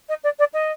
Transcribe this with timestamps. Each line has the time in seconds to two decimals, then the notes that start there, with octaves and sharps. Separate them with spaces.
0.09 D#5
0.23 D5
0.39 D5
0.53 D#5